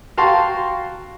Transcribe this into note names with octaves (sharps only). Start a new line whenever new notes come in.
F#4 F5 G5 A5 C6 C#6